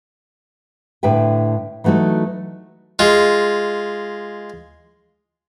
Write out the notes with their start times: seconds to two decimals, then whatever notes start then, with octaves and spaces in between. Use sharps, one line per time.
1.03 A2 D3 D4 B4 E5 G5
1.84 E3 F#3 A3 D#4 F#4
2.99 G#3 F4